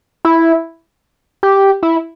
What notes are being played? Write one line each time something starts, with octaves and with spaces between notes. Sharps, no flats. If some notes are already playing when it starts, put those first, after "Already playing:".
E4
G4
E4